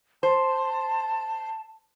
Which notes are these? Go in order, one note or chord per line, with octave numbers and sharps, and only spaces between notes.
C5 A5